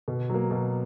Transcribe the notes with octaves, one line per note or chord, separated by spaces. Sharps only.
B2
F#3 A#3
B2